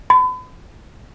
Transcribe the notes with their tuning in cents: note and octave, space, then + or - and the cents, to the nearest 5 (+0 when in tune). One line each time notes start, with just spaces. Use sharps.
B5 +40